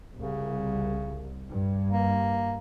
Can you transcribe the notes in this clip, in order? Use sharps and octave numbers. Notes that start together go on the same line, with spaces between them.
C2 C#3
G2
A#3